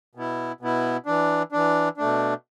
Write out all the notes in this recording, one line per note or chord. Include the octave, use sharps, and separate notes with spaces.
B2 B3 E4
B2 B3 E4
E3 D4
E3 D4
B2 A3 D4